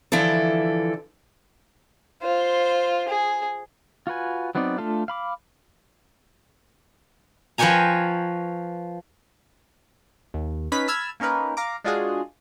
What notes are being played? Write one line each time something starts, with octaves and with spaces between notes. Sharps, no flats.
D3 E3 F3 E4 A4
F4 C5
G#4
F4 F#4 B4 G#5
F#3 B3 C4 D#4 D5
A3 D4 F4 A4 F5
F5 B5 D6
F3 B4 C#5 G5 G#5 A#5
D#2
C#4 D#4 B4 B5 B6
A5 B5 E6 F6 G#6
A#3 C#4 D#4 A#4 B4
F5 A#5 D6
G#3 D4 F4 F#4 G#4